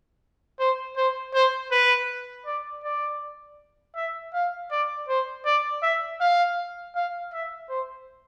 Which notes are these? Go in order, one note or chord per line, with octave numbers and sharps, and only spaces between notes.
C5
C5
C5
B4
D5
D5
E5
F5
D5
C5
D5
E5
F5
F5
E5
C5